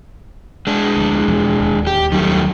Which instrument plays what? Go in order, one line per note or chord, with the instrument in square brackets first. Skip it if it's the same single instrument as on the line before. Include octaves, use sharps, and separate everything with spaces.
[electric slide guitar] G#3 D4
[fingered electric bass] D2 F3
E2 B2 F3
D1 D#2
[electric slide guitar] G4
[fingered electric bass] D#2 F#3 C#4 [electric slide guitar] D#3 G3 A3